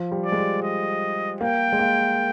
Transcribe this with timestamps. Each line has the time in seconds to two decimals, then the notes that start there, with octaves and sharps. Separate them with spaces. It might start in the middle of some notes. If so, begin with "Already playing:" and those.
Already playing: F3
0.12 G3
0.25 D5
0.32 G#3
0.37 G3
0.63 D#5
1.41 A#3 G5
1.72 G#3
1.79 A#3